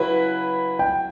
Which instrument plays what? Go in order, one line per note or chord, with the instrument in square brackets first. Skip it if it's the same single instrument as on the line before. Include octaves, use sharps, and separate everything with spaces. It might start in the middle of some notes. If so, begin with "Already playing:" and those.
Already playing: [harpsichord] C#3 F#3 E4 [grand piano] B4
[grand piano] G5